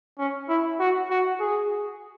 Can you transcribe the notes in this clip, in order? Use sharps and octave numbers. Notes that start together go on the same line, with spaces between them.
C#4
E4
F#4
F#4
G#4